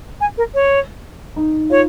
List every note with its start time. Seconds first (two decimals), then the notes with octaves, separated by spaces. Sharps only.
0.20 G#5
0.37 A#4
0.54 C#5
1.36 D#4
1.70 F4 C#5